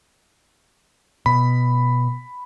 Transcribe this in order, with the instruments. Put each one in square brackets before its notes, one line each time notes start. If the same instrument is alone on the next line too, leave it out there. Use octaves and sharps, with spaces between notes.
[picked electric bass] B2 [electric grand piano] B5